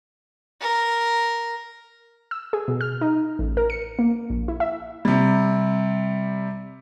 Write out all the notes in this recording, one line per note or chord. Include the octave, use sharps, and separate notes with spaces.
A#4
E6
G#4
B2
F6
D#4
A1
A#4
C#7
A#3
A#1
E4
E5
C3 G3